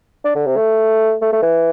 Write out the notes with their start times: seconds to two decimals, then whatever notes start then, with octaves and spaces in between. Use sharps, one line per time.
0.25 D4
0.35 D3
0.46 C3
0.57 A3
1.21 A3
1.33 A3
1.42 E3